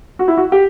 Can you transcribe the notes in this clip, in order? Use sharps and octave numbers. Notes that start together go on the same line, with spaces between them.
F#4
E4
F#4
G4